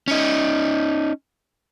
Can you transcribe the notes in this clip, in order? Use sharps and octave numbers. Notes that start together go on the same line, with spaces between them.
C#4 D#4